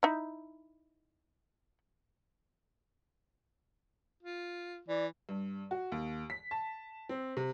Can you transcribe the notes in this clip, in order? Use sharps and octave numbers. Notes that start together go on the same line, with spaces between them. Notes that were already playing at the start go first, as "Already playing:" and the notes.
D#4 E4
F4
E3 D5
G2
F#4
D#2
B6
A5
C4
C3